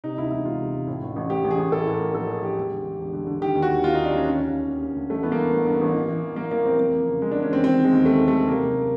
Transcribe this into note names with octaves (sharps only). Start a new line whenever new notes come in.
C3 D#4
D2 E4
E1 E4
E1 F4
C3
E1
A2
A1
A1
A1 G4
A1
G#4
A1
A2 A4
E3
A#4
A2
A#1 A4
E3 G#4
A#1 G4
E1
D3
D3
E1
D3
D3
D#3 G4
D#2
F#4
D#2
D#2 F4
D#2 D#4
D4
D#2 C#4
D#3
D2
D2
D2
D2
D2
A1 A3
E3 B3
A#3
G2
A1
G2
A1
E3
E3
E3
E3 A#3
E3 A#3
F1 C4
E2 A#3
F3
C#3
C#3 G#3
E2 D4
C#4
E2 C4
D#3 C4
D#3
G#3
D#2
D#3 A3
D#3
A3
D#3
C3 A#3
F#1